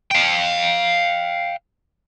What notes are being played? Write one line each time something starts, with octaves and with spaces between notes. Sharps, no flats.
F5 G5